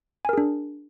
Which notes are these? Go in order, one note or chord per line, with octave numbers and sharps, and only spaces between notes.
D4 G#4 A#4 G#5